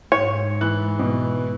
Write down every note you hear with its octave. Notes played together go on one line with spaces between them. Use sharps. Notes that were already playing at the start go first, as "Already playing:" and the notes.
G#2 C#5
E3 F#6
B2